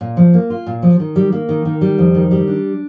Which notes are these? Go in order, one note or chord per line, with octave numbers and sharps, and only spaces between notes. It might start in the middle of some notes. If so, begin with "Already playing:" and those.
A#2
F3
A#3
F4
A#2
F3
D#3
G3
A#3
D#3
D#3
G3
F2
D#3
G3
D4